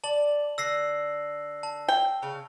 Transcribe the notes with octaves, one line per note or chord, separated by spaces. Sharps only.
D5 A5 F#7
D3 E6 A#6 C7
A5
G5
C#3 F5